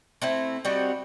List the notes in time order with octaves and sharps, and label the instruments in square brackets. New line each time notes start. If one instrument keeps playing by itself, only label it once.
[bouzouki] A3 C4 E4
G3 C4 D#4 F#4